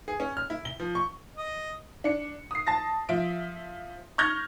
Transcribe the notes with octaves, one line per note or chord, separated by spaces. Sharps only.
G#4
C#4
F6
E4
G7
F3
C#6
D#5
D4 C#7
D#6 C7
A5 A6 A#6
F3 E5 D7
C#6 F6 G6 G#6 A#6